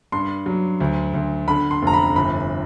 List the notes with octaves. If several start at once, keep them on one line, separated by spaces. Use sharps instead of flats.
G2 C6
F#3
D2
D2
D3 B5
C6
F1
A#5
B5
G1 B5